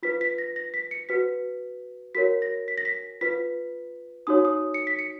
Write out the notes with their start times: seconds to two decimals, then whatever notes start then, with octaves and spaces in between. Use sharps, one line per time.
0.03 F4 B4 B6
0.21 B6
0.38 A#6
0.56 A#6
0.74 B6
0.91 C#7
1.09 F#4 B4 B6
2.15 F#4 A#4 C#5 B6
2.42 A#6
2.68 B6
2.78 A#6
2.85 B6
3.21 F4 B4 B6
4.27 D#4 F#4 C#5 D#6
4.45 D#6
4.74 C#7
4.87 B6
4.99 C#7